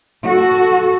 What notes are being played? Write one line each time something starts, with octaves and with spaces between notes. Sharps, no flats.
F#4 A4